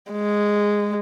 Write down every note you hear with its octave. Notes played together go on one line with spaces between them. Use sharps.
G#3